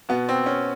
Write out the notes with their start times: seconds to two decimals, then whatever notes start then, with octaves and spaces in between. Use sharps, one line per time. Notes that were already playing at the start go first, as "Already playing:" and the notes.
0.09 B2 B3
0.29 C4
0.46 C#4